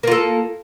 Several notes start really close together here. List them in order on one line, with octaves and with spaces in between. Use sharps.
A#3 F4 A4